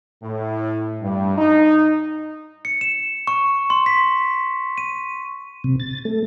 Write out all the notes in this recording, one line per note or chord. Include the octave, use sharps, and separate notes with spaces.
A2
G2
D#4
C#7
E7
C#6
C6
B6
D#7
C3
A6
A3